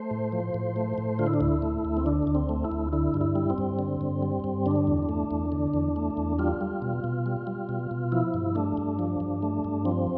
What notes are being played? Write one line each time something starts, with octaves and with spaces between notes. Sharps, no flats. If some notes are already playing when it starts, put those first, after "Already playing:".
Already playing: A3 C5
A2
F3
A2
A3
A2
D3 F4
E4
D4
D2 E4
A3
D2
C4
D3 D4
D2
C4
A3
E4
D2
D3 E4
G2
E4
G3
C4
G2
D3
G2
G3
G2
D3 D4
E2
A3
E2
D3
E2
A3
E2
G3 F4
G3
B2
B2
G3
G3
B2
B2
F3 E4
G2
A3 D4
G2
F3
G2
A3
G2
F3 C4